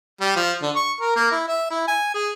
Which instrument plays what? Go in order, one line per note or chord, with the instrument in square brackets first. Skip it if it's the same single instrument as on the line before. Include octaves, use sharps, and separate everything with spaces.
[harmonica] G3
F3
D3
C#6
A#4
A#3
E4
E5
E4
G#5
G#4